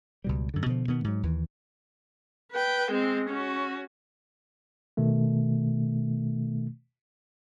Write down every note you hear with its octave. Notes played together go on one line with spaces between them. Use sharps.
C#2 B2 G3
F#2 D3
B2 D3 F3
B2 D#3 B3
G#2 F#3
D#2 E3
B4 G5
G#3 C4
C#4 F#4
B2 D#3 A3